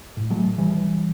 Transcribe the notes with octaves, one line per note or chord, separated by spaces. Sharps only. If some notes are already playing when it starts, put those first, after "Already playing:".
A2
F#3 A3
B1 E3 G3